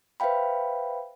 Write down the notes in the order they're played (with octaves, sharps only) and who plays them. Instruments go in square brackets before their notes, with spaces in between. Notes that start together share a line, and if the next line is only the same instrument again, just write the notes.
[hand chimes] B4 C5 E5 F5 G5 B5